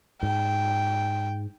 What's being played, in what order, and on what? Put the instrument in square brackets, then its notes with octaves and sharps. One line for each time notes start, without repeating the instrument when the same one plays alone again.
[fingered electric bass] G#2 [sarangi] G5